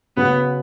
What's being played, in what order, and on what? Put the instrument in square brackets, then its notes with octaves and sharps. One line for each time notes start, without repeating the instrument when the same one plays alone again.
[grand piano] C#3 F#3 C#4 [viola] B3